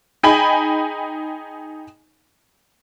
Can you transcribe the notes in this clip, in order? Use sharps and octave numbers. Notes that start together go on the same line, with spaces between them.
D#4 G#4 G5 G#5 B5